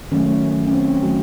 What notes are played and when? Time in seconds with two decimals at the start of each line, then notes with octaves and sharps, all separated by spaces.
0.12 D#3 F#3 A3 C#4
0.67 C#4
0.73 C4
1.03 D#3 F#3 A3 F#4